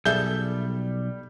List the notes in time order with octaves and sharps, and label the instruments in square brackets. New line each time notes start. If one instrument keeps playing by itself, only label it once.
[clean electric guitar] B1 [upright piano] G3 [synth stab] G#4 A4 E5 [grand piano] G6 G7